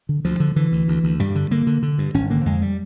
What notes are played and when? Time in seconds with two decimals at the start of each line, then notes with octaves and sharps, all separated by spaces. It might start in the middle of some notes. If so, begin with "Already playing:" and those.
0.09 D3
0.25 D2 F3
0.40 D3
0.56 D3 E3
0.72 D2
0.88 D2
1.04 D2
1.19 G2 G3
1.35 D3
1.51 D3 A#3
1.67 D3
1.83 D3
1.98 G2
2.14 G#1 C#4
2.30 D3 A#3
2.46 F2 G#3
2.62 G3